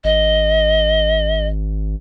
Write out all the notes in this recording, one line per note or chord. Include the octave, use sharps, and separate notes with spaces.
G#1 D#5